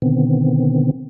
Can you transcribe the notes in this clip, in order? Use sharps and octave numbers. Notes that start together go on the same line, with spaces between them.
B2 D3 D#3 B3 C4